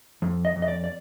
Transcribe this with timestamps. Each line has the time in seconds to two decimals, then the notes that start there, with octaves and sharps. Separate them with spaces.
0.22 F2
0.45 D#5
0.56 F2
0.62 D#5
0.68 D5
0.84 D5